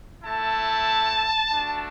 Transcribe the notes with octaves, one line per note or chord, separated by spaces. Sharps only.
A3 E4 A5
A3 D4 F#4